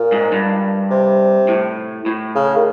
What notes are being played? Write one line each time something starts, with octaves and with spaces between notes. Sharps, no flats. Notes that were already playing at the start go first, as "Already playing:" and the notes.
Already playing: A#2
G#2
G2
C3
A2
A2
C#3
D#3